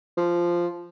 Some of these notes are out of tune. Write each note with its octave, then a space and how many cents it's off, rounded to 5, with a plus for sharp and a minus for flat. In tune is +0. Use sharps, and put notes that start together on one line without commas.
F3 -10